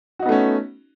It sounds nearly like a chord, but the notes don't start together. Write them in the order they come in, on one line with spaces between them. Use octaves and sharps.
F#4 D#4 B3 A3 C#4